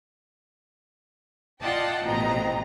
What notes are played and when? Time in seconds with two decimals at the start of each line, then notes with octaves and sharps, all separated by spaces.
1.62 F4 D5 D#5 F#5 G5 A5
2.05 A1 F2 B2 D#5 A#5